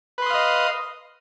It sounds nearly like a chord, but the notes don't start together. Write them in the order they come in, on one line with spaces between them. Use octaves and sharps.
B4 C6 D#6 F5 D#5